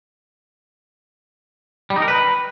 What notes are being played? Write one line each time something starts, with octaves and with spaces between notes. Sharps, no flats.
G3
D#4
A#4
B4